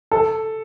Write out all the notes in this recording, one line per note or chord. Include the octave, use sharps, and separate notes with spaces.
A4